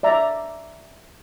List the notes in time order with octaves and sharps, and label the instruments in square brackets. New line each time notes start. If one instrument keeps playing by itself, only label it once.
[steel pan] D5 E5 A#5